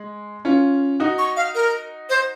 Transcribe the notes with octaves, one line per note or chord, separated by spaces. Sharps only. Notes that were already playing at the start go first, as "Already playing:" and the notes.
Already playing: G#3
C#4 F4
D#4 F#4
C#6
F5
A#4
C5